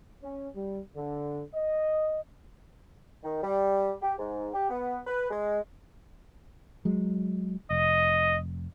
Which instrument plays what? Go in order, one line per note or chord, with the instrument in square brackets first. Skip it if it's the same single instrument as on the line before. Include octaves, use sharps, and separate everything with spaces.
[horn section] C#4
G3
D3
D#5
[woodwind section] D#3
G3
G4
G#2
G4
B3
B4
G#3
[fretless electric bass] F#3 G#3
[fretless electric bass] F1 [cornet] D#5